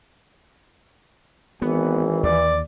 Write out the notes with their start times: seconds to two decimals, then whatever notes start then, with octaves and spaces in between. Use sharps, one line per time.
1.62 G#1 E3 B3
2.23 D#2 D5